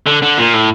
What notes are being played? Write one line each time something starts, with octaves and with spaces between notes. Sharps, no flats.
D3
D3
A#2
A2